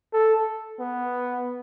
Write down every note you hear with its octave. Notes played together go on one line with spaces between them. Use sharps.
A4
B3